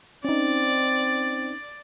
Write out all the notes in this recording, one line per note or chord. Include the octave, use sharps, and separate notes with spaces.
C4 C#4 D#4 D5